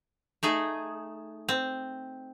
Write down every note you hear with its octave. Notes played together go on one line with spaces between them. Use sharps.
A3 D#4 G#4
C4